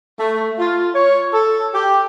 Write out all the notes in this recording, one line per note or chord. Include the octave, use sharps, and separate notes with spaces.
A3
F4
C#5
A4
G4